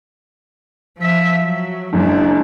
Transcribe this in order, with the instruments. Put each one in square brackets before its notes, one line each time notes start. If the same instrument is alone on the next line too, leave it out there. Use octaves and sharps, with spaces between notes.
[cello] F3 E5
F#3
[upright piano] F#1 F#2 [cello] G#3 D4